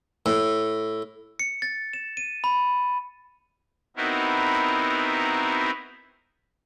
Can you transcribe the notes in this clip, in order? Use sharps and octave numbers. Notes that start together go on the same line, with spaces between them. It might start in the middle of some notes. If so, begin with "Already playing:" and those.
A2
C#7
A6
E7
D#7
B5
B3 C4 D#4 E4 F#4 A#4